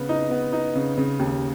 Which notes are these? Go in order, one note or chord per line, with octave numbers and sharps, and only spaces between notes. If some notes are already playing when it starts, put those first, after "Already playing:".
Already playing: C#3 B3
D#4
B3
D#4
C#3
C#3
D#2